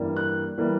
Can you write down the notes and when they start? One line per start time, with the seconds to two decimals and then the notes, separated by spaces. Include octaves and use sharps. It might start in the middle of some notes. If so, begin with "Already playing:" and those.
Already playing: G2 E3 G3 A#3
0.17 F#6
0.58 E3 G3 A#3